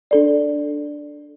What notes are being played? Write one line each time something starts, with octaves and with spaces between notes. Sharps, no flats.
D4 A4 D5